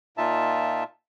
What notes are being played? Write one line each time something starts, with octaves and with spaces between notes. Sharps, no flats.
A#2 D#4 F4 E5 A5